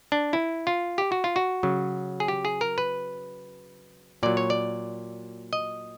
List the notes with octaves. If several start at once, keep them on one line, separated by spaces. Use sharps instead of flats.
D4
E4
F4
G4
F#4
F4
F#4
C#3 F#3
G#4
G4
G#4
A#4
B4
A#2 F#3 D5
C#5
D5
D#5